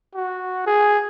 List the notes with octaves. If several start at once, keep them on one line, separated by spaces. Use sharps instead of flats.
F#4
G#4